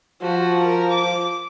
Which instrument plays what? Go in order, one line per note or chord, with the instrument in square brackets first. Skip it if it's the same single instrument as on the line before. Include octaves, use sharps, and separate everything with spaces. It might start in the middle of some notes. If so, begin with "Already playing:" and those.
[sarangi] F3 [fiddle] F#4
[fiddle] A#4
D6